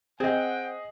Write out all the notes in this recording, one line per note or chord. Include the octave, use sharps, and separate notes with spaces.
C4 G#4 D#5 F#5 G5